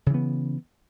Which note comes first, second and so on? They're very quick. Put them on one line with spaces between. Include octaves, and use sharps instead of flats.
C#3 E3 B3